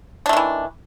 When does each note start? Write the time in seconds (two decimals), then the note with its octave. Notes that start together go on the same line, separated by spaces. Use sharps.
0.26 D4
0.29 A3
0.33 D#3
0.37 E3